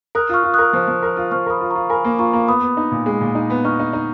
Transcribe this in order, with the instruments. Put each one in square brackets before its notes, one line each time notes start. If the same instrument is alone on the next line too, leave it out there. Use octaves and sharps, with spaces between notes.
[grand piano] A#4 [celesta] D#6 F#6
[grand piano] F4 [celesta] C#6 F6
[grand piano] F4
[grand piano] A#4 [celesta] D#6 F#6
[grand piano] F3
F3
A#4
F4
[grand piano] F3 [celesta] C#6 F6
[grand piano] A#4 [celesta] B5 D#6
[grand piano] F4
[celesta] A#5 C#6
[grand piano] F4
[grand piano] A#4 [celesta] G#5 B5
[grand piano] A#3
[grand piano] F4 [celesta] A#5 C#6
[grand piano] A#3
[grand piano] B3 [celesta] B5 D#6
[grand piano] B3
D#4
A#2
G#3
A#2
D#4
B3
[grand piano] D#4 [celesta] C#6 F6
[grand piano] D#4
D#4